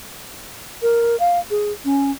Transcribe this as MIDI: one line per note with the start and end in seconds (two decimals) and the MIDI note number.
0.82 1.19 70
1.20 1.39 77
1.51 1.72 68
1.85 2.11 61